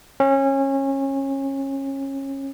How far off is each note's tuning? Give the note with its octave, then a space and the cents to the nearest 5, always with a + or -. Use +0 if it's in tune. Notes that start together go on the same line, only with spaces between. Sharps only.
C#4 -25